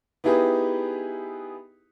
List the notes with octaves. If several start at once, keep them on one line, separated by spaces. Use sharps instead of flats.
B3 D#4 E4 G4 G#4 B4